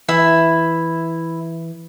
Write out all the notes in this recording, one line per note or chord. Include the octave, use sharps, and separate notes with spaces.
E3 E4